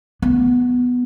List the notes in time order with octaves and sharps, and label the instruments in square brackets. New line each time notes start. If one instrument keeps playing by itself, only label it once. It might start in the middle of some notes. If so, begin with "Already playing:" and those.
[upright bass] B3